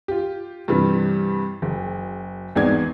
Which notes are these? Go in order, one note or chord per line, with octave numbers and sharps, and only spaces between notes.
F4 G4
G2 C3 E3 G3
F#1
G#1 E2 G#3 D#4 D5 G#6